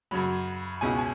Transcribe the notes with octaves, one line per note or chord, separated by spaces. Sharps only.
F#2 C#3 F#3 B5
C#2 B2 G#3 C#4 E4 G#5
G#5